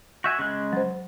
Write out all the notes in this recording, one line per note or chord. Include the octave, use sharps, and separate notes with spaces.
F#4 E5 G#5 G6
C#3 G#3 F#6
F#3 C5